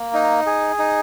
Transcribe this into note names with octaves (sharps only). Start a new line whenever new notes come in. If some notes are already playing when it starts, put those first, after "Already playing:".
Already playing: A#3
D#4
G#4
D#4